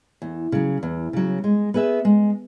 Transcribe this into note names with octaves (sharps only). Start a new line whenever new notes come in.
E2
C#3 F#3
E2
C#3 F#3
G#3
B3 G#4 B4 E5
G#3